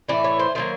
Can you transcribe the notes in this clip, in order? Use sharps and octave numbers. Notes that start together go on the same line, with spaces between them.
A2 E3 A3 D5
C#5
C5
D#3 F#3 A#3 C5